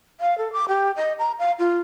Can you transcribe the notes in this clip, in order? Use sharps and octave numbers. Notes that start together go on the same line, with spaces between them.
F5
A4
D6
G4
D#5
A#5
F5
F4